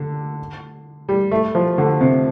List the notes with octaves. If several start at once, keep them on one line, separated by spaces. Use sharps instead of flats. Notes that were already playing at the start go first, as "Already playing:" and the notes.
Already playing: D3
G3
A3
F3
D3
C3